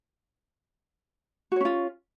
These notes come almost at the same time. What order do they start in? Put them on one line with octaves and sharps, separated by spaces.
F#4 C#5 C#4 F4